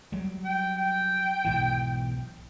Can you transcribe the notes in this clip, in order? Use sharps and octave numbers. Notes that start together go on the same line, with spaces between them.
F#3 G3
G5
G5
B1 G#2 E3